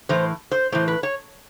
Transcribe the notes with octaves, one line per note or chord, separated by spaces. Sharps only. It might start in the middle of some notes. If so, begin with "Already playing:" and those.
A2 E3 C5
C5
A2 E3 C5
B4
C#5